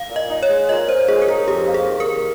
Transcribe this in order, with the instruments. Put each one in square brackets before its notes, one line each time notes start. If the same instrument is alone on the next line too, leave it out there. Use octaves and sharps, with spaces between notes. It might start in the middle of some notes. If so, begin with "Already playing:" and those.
Already playing: [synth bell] F5
[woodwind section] A#2
[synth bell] D#5
[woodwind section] D#4
[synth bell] C#5
[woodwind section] G#3
[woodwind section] A#2 [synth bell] D#5
[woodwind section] A#2 [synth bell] C5
[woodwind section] G#3 [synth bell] G#4
[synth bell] A#4
[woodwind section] D#4 [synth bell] G#4
[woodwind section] F2 [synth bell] G4
[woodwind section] A#3
[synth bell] G#4
[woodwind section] D#3
[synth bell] A#4
[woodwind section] A#3